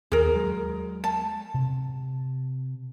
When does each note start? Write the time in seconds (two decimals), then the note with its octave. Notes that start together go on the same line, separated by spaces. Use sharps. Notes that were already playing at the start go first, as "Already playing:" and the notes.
0.12 D#2 G#4 A#4
0.34 F#3 G#3
1.04 A5
1.54 C3